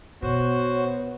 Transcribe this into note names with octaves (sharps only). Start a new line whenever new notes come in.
B2 B3 F#4 C5 C#5